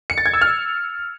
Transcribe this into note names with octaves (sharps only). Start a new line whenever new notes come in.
C#7
A6
G#6
E6
F6